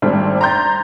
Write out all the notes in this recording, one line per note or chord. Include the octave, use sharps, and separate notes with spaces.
G#1 G3 A3 C4 D4
A#5 C6 G6 A6